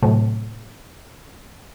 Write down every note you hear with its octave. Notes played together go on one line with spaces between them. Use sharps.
A2 C3 F#3 A3